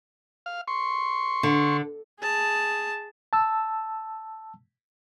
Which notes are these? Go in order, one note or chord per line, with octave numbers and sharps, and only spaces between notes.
F5 F6
C6 C#6
D3
G#4 A5
A5 E6